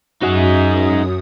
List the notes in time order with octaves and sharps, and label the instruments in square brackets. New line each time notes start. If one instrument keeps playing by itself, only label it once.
[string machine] F#2 D#6 [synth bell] C#4 F#4 E5 [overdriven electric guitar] D#4 G#4